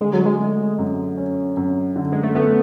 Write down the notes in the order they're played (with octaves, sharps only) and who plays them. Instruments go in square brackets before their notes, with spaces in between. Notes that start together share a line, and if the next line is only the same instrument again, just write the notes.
[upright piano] D3 [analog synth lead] G#3
[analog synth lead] F#3
G#3
[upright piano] A3
F#2
C#4
F#2
D3
[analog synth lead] G#3
A3
[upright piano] A3 [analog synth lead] B3